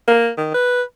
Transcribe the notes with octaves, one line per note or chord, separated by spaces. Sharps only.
A#3
D#3
B4